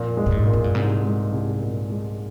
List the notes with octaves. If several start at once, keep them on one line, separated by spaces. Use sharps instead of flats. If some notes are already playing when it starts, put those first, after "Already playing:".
Already playing: F2 A#2
G#3
A#2
G#2
A#2
F2
G2
C2 G#2
G#3
C2
A#2
G#3